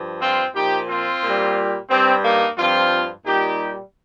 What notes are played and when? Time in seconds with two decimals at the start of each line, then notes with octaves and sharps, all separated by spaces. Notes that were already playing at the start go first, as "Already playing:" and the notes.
Already playing: G2 F3
0.21 C4 F4
0.54 A#2 F3 D#4 G4
0.88 C4 F4
1.22 A#2
1.27 G3
1.89 G2 G3 C4
2.23 A#3 D#4
2.57 G2 F3 C4 F4
3.25 A#2 G3 D#4 G4